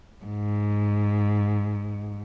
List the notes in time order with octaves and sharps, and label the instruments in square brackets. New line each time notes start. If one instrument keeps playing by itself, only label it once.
[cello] G#2